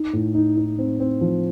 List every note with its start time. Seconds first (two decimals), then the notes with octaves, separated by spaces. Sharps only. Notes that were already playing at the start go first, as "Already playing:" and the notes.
Already playing: D#4
0.13 A2
0.35 D#4
0.57 D#4
0.79 C4
1.00 C4
1.21 F3